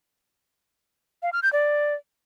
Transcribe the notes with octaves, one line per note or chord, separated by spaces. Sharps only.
F5
F6
G6
D5